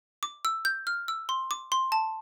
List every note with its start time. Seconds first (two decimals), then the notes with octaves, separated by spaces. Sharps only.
0.23 D6
0.45 E6
0.65 G6
0.87 F6
1.08 E6
1.29 C6
1.51 D6
1.72 C6
1.92 A5